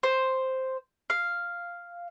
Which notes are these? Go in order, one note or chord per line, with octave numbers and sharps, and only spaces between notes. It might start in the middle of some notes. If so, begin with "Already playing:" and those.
C5
F5